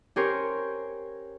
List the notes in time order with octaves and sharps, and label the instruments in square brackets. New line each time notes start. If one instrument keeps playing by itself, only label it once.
[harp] C#4 G4 A#4 C5 C#5